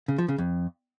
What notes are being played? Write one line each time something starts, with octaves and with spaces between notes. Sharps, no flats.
C#3
F3
C#3
F2